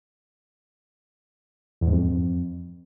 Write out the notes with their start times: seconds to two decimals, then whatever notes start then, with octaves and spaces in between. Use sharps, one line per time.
1.81 E2
1.87 G#2
1.92 F2